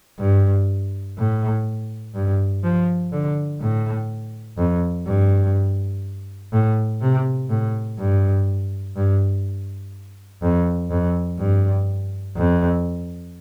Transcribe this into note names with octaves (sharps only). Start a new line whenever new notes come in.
G2
A2
G2
F3
D3
A2
F2
G2
A2
C3
A2
G2
G2
F2
F2
G2
F2